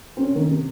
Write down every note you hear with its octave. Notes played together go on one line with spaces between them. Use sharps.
C4
C3 C#4
D#3
C3